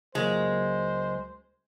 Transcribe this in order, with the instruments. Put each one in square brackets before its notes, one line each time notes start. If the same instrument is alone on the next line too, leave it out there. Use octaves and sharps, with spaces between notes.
[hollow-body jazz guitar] C#2 F#3 A#3 [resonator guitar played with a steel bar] G#3 [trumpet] C5